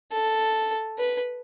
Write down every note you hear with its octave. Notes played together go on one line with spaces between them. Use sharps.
A4
B4